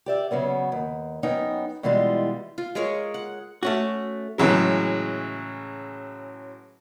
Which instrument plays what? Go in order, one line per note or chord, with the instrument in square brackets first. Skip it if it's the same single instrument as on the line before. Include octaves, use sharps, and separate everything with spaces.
[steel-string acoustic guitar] G4 D5 E5
C#3 F#3 B3 C#4
D#2
F#2 B3 C#4 D#4 G5
B2 E3 G3 G#3 F4
[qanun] F4
G#3 G#4 A#4 C#5
F#5
[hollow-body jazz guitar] A3 C#4 F#4
[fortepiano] A2 C#3 E3 F#3 G#3